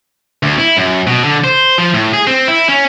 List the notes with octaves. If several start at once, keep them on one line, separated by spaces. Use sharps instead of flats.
D2
E4
F#2
B2
D3
C5
F3
A2
G#4
C4
E4
C#4